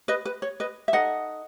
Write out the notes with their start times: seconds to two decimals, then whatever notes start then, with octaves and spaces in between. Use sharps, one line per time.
0.08 B4 D#5
0.25 B4
0.42 C#5
0.60 B4 D#5
0.88 E5
0.93 D#4 A4 D#5 F#5